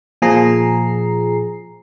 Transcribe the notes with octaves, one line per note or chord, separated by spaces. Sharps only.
A#2 F3 G#4 A#5 C7